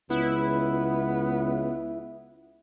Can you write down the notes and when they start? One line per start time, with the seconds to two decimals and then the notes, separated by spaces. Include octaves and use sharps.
0.10 C#2 B3 E4